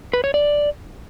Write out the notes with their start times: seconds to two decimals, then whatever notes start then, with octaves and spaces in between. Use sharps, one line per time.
0.13 B4
0.24 C#5
0.34 D5